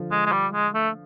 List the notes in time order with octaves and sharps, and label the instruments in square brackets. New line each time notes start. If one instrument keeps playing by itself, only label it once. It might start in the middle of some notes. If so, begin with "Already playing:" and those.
Already playing: [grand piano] D3 F3
[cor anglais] G#3
G#3
G3
G#3
A3